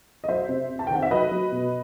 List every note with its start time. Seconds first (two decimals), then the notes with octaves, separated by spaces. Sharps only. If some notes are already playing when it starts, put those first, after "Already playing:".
0.24 D#5
0.28 F#3 C5 E5
0.49 C3
0.69 C3
0.79 A5
0.87 G5
0.90 D#3 F#5
1.02 E5
1.11 F#3 B4 D#5
1.32 F#3
1.52 B2